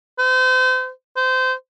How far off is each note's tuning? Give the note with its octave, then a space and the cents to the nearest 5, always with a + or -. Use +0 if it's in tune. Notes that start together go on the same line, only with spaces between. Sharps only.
C5 -35
C5 -25